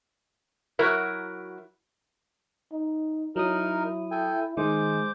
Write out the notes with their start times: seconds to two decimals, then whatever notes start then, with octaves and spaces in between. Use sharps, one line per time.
0.79 F#3 E4 F#4 A#4 E5
2.72 D#4
3.36 F#3 D#4 E4 A#4 D#6
4.11 A4 G5 G#5
4.57 D#3 G#3 C5 D6